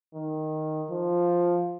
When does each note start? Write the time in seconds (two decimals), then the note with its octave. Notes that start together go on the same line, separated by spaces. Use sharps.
0.15 D#3
0.90 F3